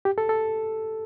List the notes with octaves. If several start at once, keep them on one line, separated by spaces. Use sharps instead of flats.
G4
A4
A4